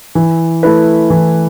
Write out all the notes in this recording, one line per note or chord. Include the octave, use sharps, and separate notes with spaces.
E3
A3 E4 B4
E3